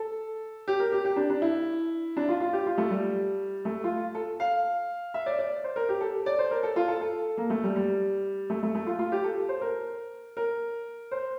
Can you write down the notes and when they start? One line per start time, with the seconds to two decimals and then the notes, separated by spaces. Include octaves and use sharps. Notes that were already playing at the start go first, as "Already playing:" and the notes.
Already playing: A4
0.68 G4
0.80 A#4
0.92 G4
1.05 G4
1.16 D4
1.30 D4
1.42 E4
2.17 D4
2.29 F4
2.40 F4
2.53 G4
2.66 F4
2.78 A3
2.90 G3
3.65 A3
3.84 F4
4.15 A4
4.40 F5
5.14 E5
5.26 D5
5.39 D5
5.64 C5
5.76 A#4
5.89 G4
6.01 A4
6.26 D5
6.39 C5
6.51 A#4
6.63 A4
6.76 F4
6.88 A4
7.01 A4
7.37 A#3
7.50 A3
7.63 G3
7.76 G3
8.50 A3
8.63 A3
8.75 A3
8.87 F4
8.99 F4
9.12 G4
9.24 A4
9.49 C5
9.61 A#4
10.37 A#4
11.11 C5